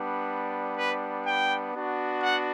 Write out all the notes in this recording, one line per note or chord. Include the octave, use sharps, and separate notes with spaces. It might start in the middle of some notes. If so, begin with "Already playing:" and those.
Already playing: G3 B3 D4
B4
G5
B3 D4 F#4
F#5